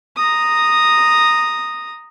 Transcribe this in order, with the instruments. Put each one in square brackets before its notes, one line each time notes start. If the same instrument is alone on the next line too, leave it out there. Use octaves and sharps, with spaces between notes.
[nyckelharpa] A#5 D#6